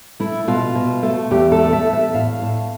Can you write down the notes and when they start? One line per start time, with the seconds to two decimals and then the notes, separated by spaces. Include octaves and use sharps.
0.20 A3 E4
0.48 B2 F4
0.75 B2
1.03 A3
1.31 E2 G4
1.52 A4
1.59 A3
1.73 E5
1.86 E2
1.93 E5
2.14 A2 F5
2.42 A2